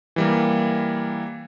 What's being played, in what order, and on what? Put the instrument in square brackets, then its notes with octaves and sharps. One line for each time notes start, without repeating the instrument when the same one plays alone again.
[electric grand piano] E3 G3 A#3